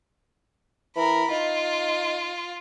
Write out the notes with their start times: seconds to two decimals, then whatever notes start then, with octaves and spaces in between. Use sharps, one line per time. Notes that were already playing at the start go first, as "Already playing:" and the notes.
0.96 E3 A#4 B5
1.31 D#4 F4